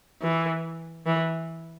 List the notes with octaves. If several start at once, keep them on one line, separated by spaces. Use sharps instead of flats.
E3
E3